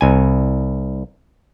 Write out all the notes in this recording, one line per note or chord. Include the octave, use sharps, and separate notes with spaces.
C2 G#5